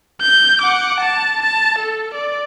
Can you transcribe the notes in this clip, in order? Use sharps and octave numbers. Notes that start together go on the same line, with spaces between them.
G6
F#5 D6
A5
A5
A4
D5